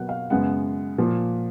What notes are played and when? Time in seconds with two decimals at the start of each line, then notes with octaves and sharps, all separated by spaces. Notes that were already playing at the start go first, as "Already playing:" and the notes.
Already playing: B2 F#3 A#3 F#5
0.09 F5
0.30 F#2 C#3 G#3 B3 F#5
0.98 A#2 F3 A#3